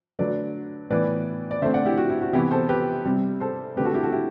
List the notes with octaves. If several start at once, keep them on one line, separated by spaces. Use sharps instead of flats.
D3 F#3 A3 B4 D5
A2 E3 B3 B4 D5
D5
D3 A3 C4 C5 E5
D5 F#5
E4 G4
F#4
E4
F#4
C3 E3 B3 E4 G4
A4 C5
G4 B4
C3 G3 C4
A4 C5
D3 A3 C4 G4 B4
F#4 A4
E4 G4
F#4 A4
E4 G4